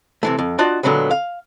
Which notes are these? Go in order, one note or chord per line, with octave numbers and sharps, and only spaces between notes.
C3 E3 A3
F2
D4 F4 F#4 D5 D#5
A#2 D3 F#3 G#3 B3
F5